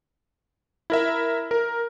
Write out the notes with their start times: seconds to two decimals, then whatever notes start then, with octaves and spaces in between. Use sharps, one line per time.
0.90 E4 A#4 E5
1.51 A#4